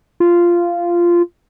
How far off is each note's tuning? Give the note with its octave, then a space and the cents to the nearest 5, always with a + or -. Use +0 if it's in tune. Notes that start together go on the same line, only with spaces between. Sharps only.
F4 -10